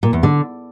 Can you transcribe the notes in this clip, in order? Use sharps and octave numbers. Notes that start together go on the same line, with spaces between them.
A#2
E2
D3